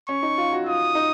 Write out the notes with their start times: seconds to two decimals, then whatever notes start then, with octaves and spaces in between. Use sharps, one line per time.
0.08 C#4 C#6
0.23 D#4
0.38 F4
0.52 F#4
0.66 F4 D#6
0.95 D#4